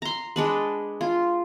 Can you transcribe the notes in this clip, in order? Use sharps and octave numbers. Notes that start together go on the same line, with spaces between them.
A#5 C6
G#3 D4 B4
F4